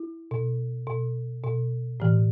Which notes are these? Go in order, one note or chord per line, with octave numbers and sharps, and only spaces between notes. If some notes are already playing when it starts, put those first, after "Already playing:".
Already playing: E4
B2
B2
B2
A2 E3